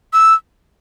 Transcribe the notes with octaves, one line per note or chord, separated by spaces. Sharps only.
E6